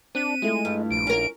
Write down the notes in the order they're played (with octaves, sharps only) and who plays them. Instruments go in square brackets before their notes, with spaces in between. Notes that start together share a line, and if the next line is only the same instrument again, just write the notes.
[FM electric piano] C4 F#6 B6 [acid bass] D4 [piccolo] D#7
[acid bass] G#3 [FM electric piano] A3 E4 F4
[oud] G2
[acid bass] A#1 [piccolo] D7
[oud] C#4 A#4